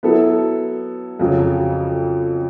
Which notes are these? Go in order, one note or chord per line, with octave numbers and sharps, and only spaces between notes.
F#3 B3 E4 A4
F2 C#3 F#3